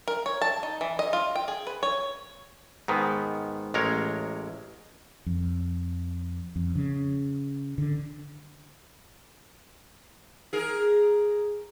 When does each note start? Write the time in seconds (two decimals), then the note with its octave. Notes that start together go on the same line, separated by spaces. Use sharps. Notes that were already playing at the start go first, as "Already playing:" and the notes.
0.08 A#4
0.26 C#5
0.42 A5
0.63 D#4
0.81 E3
0.99 D#5
1.13 F4
1.36 G5
1.48 G#4
1.67 B4
1.83 C#5
2.88 G#2 D#3 B3
3.74 A1 G#3 A#4 C#5
5.26 F2
6.56 F2
6.75 C#3
7.78 D3
10.53 G#4 A#4